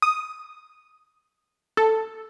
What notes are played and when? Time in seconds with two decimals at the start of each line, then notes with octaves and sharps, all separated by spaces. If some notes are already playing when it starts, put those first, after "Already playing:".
0.02 D#6
1.77 A4